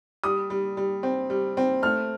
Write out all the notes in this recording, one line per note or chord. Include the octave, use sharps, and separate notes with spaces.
G3 D#6
G3
G3
C4
G3
C4
A3 F6